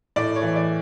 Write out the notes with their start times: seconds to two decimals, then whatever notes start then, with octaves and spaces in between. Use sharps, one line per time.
0.16 A2 D5
0.36 C#5
0.42 E3
0.56 D5